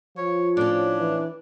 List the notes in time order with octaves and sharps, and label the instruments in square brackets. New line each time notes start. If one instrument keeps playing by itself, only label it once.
[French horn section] F3 F4 [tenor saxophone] C#5
[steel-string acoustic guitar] A2 C#4 [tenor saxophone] D4
[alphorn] E3